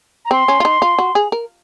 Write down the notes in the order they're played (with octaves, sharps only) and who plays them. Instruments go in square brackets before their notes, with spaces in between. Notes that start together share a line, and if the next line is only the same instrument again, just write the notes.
[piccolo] A#5
[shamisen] C4 [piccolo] C6
[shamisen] C#4
F4
D#4
F4
F#4
G#4
A#4